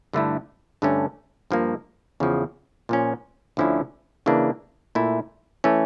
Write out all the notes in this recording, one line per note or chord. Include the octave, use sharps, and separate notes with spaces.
G2 D3 A3 E4
G2 D3 A3 C#4
G2 F3 A#3
E2 C#3 F3
A#2 F3 C#4
D2 D3 F3 C#4 E4
C#3 E3 A#3 D4
A#2 A3 E4
E3 A3 C#4